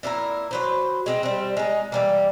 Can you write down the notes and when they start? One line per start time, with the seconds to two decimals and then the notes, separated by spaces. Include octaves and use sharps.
0.03 A#2 E4 F#4 A#4
0.51 F#3 B4 C5
1.06 G#3 C4 D#4
1.23 G3 C4
1.57 G#3 D#4
1.92 E3 G3 A#3